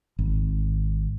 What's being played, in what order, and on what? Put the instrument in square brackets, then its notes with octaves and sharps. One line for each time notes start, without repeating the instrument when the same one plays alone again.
[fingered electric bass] G#1